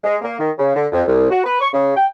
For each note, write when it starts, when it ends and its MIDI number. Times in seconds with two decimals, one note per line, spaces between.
0.04 0.16 56
0.22 0.35 58
0.39 0.51 51
0.58 0.75 49
0.75 0.86 50
0.92 1.01 41
1.07 1.29 36
1.30 1.44 66
1.44 1.57 71
1.61 1.69 85
1.73 1.91 49
1.96 2.06 79